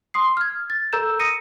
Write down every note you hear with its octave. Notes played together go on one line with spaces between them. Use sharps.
C6 D#6 C7
F6 G#6
A6
A4 A#4 A#5 E6 G6 E7
D#6 A#6 C#7 D#7